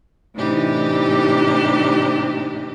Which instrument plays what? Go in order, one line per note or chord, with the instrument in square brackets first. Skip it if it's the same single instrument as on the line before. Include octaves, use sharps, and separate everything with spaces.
[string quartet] A2 C3 E3 D4 D#4 G4